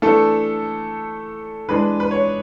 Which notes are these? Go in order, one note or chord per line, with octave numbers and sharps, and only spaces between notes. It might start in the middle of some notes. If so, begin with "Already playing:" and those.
E3 A3 D4 A4
E3 G#3 D4 B4
B4
C#5